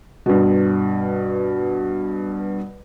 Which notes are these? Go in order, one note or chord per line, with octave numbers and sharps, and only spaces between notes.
G2 B2